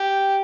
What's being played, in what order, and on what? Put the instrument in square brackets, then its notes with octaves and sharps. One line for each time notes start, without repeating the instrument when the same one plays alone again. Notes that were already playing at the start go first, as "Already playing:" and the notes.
Already playing: [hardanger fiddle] G4